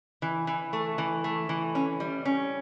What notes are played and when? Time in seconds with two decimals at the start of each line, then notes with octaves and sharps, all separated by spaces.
0.22 E3
0.47 E3
0.73 A3
0.98 E3
1.24 A3
1.49 E3
1.75 C#4
2.00 G3
2.25 C#4